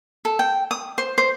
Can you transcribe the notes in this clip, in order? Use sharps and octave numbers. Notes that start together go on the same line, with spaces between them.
A4
G5
D#6
C5
C5